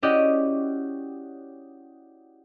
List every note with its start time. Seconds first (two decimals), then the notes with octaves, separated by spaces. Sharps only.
0.02 C#4 E4 F#4 G4 D5 D#5